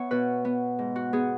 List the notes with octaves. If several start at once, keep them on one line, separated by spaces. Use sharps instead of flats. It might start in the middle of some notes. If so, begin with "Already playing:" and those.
Already playing: B3 C#5 E5 G#5
B2 B4
B3
G#2
F#4
B3 G#4